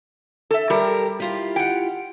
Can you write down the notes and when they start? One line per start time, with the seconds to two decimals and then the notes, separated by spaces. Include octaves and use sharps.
0.51 A4 E5
0.70 G3 G4 A4 A#4
1.20 E4 F4 G4
1.56 F#5 G5